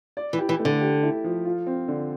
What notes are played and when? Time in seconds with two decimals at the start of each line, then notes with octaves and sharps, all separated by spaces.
0.17 D5
0.33 E3
0.39 G4
0.49 E3
0.60 A3
0.65 D3
0.81 G4
1.03 E4
1.24 F3
1.45 F4
1.67 C4
1.88 D3